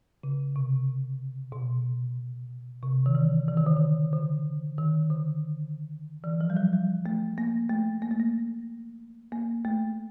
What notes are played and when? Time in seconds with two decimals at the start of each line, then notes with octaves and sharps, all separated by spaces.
0.23 C#3
0.56 C3
1.52 B2
2.83 C3
3.06 D#3
3.15 E3
3.48 E3
3.58 D#3
3.66 D3
3.77 D#3
4.13 D3
4.78 D#3
5.10 D3
6.24 E3
6.41 F3
6.50 G3
6.57 F#3
6.73 G3
7.06 A3
7.38 A#3
7.69 A3
8.02 A#3
8.11 A3
8.20 A#3
9.32 A#3
9.65 A3